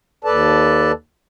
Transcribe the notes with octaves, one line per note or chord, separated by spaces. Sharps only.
D#2 A4 B4 D5 A5